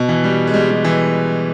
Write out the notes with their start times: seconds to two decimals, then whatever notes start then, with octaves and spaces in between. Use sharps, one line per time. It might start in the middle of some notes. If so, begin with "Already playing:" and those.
Already playing: B2
0.08 E3
0.24 G3
0.47 G#3
0.54 G3
0.70 G3
0.84 E3